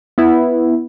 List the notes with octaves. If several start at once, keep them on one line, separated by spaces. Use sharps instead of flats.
B3 E4